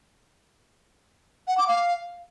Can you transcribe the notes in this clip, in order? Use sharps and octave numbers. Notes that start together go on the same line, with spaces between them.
F#5
D6
F5